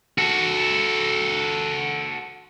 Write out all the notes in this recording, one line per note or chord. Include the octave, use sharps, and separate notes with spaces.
F#4 A4